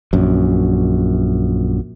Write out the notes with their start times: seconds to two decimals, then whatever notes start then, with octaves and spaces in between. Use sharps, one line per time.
0.13 A#1 F#2